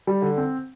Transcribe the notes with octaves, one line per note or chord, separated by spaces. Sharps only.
G3
D3
C4